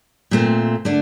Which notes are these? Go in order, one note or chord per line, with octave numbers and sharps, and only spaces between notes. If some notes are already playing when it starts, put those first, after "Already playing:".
A#2 A3 C4
D3 A3 D4